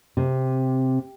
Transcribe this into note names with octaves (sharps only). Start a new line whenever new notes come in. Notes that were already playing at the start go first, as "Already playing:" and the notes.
C3